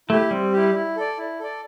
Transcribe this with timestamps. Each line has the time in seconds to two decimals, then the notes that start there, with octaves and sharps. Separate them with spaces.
0.09 A3 E4 G4
0.31 G3 C4
0.53 E4 G4
0.74 E4
0.96 A4 D5
1.18 E4
1.40 A4 D5